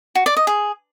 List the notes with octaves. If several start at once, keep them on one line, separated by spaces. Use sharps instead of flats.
F#4
D5
D#5
G#4